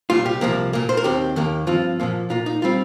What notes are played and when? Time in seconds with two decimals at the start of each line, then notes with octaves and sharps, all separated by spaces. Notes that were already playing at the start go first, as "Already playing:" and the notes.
0.10 C2 A#2 G3 F4
0.26 G4
0.41 C2 C3 F3 A#3
0.73 A#2 A#3
0.89 C5
0.97 A#4
1.04 D#2 D#3 C4 G4
1.36 D#2 D#3 A#3
1.67 G2 F3 C4 F4
2.00 A#2 F3 A#3
2.30 A#2 A#3 F4
2.46 D#4
2.62 G3 C4 F4